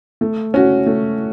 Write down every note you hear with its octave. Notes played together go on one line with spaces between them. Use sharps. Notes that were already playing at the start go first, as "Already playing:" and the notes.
A3
C#4 F#4
A3